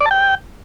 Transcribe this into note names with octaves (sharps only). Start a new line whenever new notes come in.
D5
A5
G5